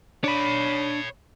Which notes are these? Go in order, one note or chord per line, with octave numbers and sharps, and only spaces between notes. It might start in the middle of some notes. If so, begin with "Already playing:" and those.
D4 C#5 B5